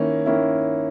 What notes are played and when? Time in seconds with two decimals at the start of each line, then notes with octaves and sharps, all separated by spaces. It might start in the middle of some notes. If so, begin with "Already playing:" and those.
Already playing: D#3 A#3 C#4 E4
0.26 D#3 A#3 C#4 E4